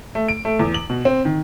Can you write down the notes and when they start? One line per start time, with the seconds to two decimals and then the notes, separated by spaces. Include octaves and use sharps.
0.15 A3
0.28 D7
0.45 A3
0.60 E2
0.74 F#7
0.90 B2
1.05 C4
1.25 D#3